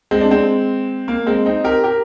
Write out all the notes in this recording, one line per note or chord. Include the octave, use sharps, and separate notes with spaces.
G#3 C4
D4
G#3 C4
A#3
G#3 C4
C4 D#4
G4 A#4
G4 A#4